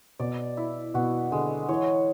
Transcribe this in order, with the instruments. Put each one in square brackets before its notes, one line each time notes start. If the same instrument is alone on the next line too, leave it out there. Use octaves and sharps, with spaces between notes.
[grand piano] B2 [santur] D5
[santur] E4
[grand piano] B2 [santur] F#4
[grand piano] D3 [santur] G#3
[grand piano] E3 [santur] C#5